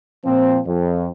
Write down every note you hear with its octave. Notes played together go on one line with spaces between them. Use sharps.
A#2 F3 C4
F2